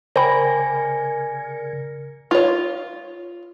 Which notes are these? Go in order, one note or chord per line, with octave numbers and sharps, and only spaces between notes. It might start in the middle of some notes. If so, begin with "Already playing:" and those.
C#3 A#4 C5 D5 G5 G#5 B5
F4 C#5